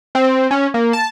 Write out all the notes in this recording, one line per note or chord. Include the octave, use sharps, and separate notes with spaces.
C4
C#4
A#3
A5